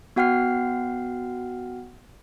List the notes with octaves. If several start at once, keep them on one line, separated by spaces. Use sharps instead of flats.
B3 F#4 F#5 G5 F6 C7